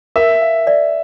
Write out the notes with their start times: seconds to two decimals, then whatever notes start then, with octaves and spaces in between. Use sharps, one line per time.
0.16 A#4 E5
0.42 F5
0.67 D5